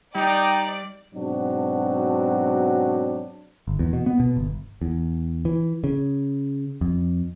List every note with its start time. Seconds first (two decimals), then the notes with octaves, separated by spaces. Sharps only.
0.15 G3 D#4 D5 G5
1.15 G#2 B2 F#3 C4 D4 F#4
3.68 G1
3.79 E2
3.93 B2
4.06 B3
4.20 B2
4.37 G1
4.82 E2
5.45 E3
5.84 C#3
6.81 F2